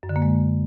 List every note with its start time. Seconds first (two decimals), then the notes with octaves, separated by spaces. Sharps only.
0.03 F#2
0.09 D3
0.16 A#3
0.22 G#3